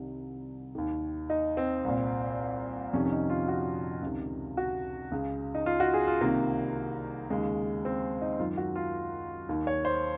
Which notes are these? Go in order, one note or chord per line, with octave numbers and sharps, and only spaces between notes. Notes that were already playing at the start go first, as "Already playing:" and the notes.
Already playing: C2 C3 D#3
D#2 D#3
D#4
C4
C2 A#2
F2 C3 D#3 C#4
C#4
D#4
F4
F#4
C#2 C3 D#3
F#4
C#2 C#3
D#4
F4
F#4
G#4
F4
C2 C3 D#3 A#3
D#2 C#3 G#3
C4
D#4
F#2 D#3 F4
F#4
F4
D#2 D#3
C#5
C5